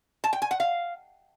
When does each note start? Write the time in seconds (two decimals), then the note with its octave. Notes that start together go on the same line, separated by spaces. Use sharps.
0.24 A5
0.33 G5
0.42 G#5
0.51 F#5
0.60 F5